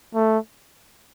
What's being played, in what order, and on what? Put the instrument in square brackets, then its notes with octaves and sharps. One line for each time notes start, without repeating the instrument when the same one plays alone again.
[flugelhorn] A3